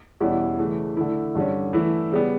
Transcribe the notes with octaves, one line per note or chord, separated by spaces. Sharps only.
E2 B2 G3 C#4 E4
C#3 E3 A3
D3 A3 E4
G2 D3 G3 C#4
E3 A3 E4
C#3 G3 B3